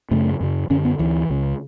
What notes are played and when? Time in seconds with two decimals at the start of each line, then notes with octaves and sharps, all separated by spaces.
0.11 F#2 C#3 A3
0.40 F#2 C#3
0.70 F#2 D3 C#4
0.85 B3
0.99 D2 D3 E3
1.30 C#2 C#3